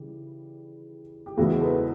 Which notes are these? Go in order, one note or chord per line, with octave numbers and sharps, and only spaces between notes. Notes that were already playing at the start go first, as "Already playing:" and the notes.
Already playing: C#3 E3 G3
G4
E2 C#3 E3 G#3 B3 E4 F#4
C5
A4 B4